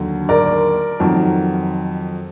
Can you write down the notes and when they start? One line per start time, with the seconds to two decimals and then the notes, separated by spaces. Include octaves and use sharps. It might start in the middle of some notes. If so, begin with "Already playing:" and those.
Already playing: D#2 D3 F#3
0.29 A#4 D5
1.00 F2 D#3 F#3